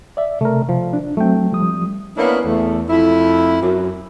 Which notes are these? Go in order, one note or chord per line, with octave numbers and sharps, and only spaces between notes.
D5 E5
C3 A3 A#4
F3
D4
F#3 A3 C4 G5
F3 G3 D#6
A#3 B3 C#4 D4 E4
E2 A3
F2 A3 E4
F#2